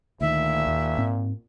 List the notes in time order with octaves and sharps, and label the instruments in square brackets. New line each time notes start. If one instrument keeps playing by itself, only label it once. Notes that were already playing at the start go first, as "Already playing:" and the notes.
[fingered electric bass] D2 D#3 [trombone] A#2 [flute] E5
[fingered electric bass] D#2
G#2 C4